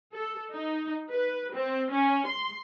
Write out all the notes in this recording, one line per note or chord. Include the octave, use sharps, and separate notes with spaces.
A4
D#4
B4
C4
C#4
C6